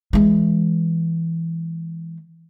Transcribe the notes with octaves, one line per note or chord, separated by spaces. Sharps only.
E3 G#3